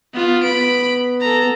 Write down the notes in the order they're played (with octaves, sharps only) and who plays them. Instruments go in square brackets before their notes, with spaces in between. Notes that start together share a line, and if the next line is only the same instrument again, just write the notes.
[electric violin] B3 F4
[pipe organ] B3 [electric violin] B5 D7
[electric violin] A4 A#5